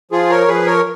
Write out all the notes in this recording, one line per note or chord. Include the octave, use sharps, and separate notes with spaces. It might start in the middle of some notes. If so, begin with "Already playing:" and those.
F3 F4 G#4
A#4 C#5
F3 G#4 B4
A#4 C#5